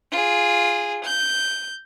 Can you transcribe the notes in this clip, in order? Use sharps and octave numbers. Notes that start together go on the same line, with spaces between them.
F4 G#4
G6